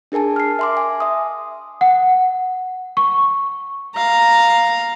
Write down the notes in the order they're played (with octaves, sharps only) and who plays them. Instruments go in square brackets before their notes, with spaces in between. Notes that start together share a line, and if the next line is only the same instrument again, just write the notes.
[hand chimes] D4 G#4 A#4 G#5 A5
F6 C7
E5 C6 D6
G#5
E5 D#6
[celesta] F#5
C#6
[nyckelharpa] F5 A#5